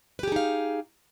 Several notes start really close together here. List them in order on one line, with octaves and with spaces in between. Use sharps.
B4 G4 G#4 D#4 F5